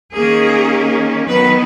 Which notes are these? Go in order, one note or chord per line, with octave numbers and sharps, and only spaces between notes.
D#3 A#3 C#4 G#4
D#3 F#3 B3 B4